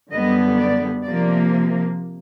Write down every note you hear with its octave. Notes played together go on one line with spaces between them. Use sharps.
F#2 D3 G3 B3 D#5
D5
C3 F3 A#3 D5